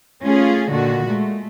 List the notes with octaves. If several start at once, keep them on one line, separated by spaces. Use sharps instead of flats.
A3 C#4 F4 G#4
A#2 D3 D#3 F#4
G#3 A3